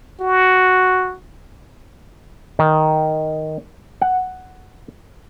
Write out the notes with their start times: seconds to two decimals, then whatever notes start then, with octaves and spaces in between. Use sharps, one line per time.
0.20 F#4
2.59 D#3
4.02 F#5